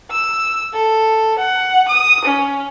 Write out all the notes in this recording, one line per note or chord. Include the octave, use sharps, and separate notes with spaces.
E6
A4
F#5
D#6
C#4